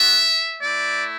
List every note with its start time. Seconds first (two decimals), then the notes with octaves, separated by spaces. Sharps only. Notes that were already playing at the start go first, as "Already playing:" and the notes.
Already playing: B3 F#4 E5
0.61 A3 E4 D5